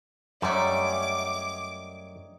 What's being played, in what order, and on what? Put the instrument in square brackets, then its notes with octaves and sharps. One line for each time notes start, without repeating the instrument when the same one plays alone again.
[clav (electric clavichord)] F#2 [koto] G3 A3 [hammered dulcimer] C#5 D#5 A#5 [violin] D6